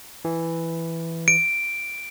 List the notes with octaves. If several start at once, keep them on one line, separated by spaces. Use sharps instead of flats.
E3
D7